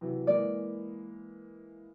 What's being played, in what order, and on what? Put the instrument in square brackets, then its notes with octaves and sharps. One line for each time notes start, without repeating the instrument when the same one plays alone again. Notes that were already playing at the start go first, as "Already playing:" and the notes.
[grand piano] C3 E3 F#3
[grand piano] E3 G#3 A#3 [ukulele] D5